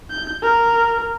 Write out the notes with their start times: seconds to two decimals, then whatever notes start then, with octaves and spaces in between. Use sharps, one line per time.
0.11 G6
0.43 A#4